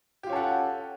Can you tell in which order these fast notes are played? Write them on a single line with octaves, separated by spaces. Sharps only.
G4 F4 C#4 A4 F#5